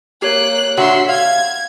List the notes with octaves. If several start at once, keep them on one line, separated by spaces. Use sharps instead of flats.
A#3 G4 C#5 F#6
A#2 D3 F#4 E5 C6
F5 G#6